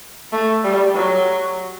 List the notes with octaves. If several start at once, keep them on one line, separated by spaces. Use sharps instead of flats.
A3
G3
F#3